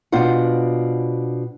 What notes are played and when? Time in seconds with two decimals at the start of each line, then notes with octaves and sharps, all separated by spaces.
0.12 B2 D4 F4 C5 F#5